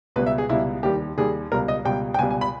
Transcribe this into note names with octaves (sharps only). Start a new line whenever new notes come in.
C#2 B2 G3 B4
E5
G#4
C#2 B2 G3 E4
D#2 D#3 G3 G4
D#2 D#3 G3 G#4
C#2 B2 G3 A#4
D#5
C#2 B2 G3 G5
G5
C#2 B2 G3 G#5
G#5
B5